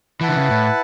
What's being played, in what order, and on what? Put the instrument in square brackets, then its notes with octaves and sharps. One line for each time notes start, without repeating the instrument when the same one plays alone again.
[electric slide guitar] E3 [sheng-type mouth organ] E4 B4 F#5 A5
[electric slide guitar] D3
C#3
A2